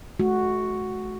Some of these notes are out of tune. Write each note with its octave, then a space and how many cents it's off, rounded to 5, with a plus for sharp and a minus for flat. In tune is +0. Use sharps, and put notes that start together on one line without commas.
A3 -45 F#4 +0